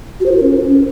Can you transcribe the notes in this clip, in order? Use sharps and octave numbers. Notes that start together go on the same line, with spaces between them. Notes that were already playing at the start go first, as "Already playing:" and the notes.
F#4
C5
F4
A#4
C#4